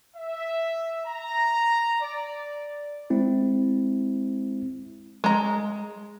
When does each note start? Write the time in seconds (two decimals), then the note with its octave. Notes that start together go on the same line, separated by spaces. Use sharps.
0.17 E5
1.06 A#5
2.01 D5
3.10 G#3 C4 E4
5.24 G#3 A#5